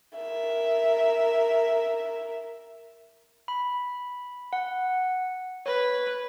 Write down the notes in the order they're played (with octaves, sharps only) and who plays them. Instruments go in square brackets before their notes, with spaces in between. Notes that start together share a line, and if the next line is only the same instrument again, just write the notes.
[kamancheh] A#4 E5
[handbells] B5
F#5
[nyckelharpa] B4 [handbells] C#5